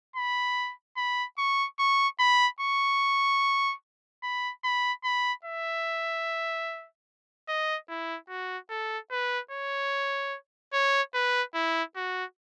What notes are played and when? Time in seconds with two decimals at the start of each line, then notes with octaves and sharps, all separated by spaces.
0.16 B5
0.97 B5
1.38 C#6
1.79 C#6
2.19 B5
2.60 C#6
4.23 B5
4.64 B5
5.04 B5
5.45 E5
7.48 D#5
7.89 E4
8.29 F#4
8.70 A4
9.11 B4
9.51 C#5
10.73 C#5
11.14 B4
11.54 E4
11.96 F#4